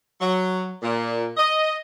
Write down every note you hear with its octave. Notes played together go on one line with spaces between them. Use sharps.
F#3
A#2
D#5